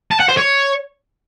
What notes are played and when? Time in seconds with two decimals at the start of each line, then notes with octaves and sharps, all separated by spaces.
0.12 A5
0.20 F#5
0.29 C5
0.37 C#5